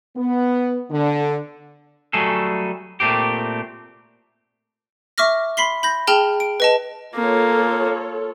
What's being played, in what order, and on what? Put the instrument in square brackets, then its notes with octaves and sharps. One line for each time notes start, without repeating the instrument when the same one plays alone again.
[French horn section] B3
D3
[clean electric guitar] F#3 G3 A3 G#4 A4
A#2 A3 C4 G4
[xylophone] E5 C#6 D6 F6 A#6
B5 C6 B6 C7 G7
B5 G6 A#6
G#4 G5 A5 F6 F7 G7
D7
B4 D#5 A5
[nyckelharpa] A#3 [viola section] F4 A4 C#5